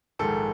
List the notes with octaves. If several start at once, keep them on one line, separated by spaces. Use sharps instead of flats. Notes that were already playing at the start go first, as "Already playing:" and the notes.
A#1 G#2 D#3 G#3 A4